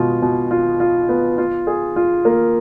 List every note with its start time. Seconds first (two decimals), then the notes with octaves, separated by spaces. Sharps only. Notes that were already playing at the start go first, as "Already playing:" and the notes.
Already playing: B2 G#3 F4
0.22 B2
0.51 F4
0.80 F4
1.09 B3
1.38 F4
1.67 G#4
1.96 F4
2.25 A#3